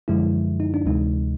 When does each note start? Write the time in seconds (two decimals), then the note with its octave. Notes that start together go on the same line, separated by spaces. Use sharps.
0.08 F#2 D3 F3 G#3 E4
0.60 D#4
0.74 D4
0.86 D2 C3 E3 G#3 D#4